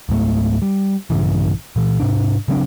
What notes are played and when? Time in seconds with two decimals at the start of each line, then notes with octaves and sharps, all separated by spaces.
0.09 C#2 G#2 G3 A3
0.62 G3
1.10 A#1 G2 C#3 E3
1.76 A#2 E3
2.00 G#2 C3 D4
2.48 C#3 F#3 C4 D4